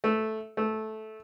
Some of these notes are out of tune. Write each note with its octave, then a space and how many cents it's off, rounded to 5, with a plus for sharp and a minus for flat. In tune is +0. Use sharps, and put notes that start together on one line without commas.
A3 -5
A3 -10